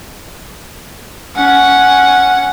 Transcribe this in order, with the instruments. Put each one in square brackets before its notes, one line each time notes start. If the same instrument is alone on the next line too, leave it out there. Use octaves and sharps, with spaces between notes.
[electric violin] C#4 F#5